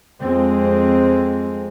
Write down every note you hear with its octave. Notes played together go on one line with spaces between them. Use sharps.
F2 G#3 C4